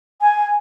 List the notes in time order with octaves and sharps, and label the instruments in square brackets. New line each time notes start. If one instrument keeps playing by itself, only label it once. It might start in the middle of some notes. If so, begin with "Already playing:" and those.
[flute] G#5